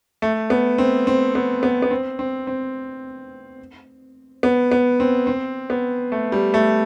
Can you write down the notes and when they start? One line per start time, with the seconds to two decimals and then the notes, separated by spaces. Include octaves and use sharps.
0.22 A3
0.50 B3
0.78 C4
1.07 C4
1.35 B3
1.63 B3
1.82 B3
1.91 C4
2.19 C4
2.47 C4
4.43 B3
4.72 B3
5.00 C4
5.27 C4
5.70 B3
6.12 A3
6.32 G3
6.54 A3